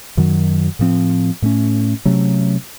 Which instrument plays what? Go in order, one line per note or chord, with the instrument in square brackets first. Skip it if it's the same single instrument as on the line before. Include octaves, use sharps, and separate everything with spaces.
[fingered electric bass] F#2 D#3 F#3
A2 F3 C4
A2 A3 C#4
C3 F#3 A3 C#4